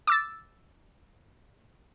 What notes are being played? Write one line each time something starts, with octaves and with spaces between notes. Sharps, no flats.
D6 E6 A6